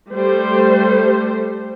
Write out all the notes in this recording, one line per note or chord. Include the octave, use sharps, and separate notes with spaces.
G3 A3 C5